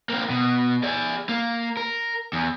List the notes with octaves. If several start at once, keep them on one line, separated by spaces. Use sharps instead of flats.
A#3 C4
B2
G#4 D5
A#3
A#4
E2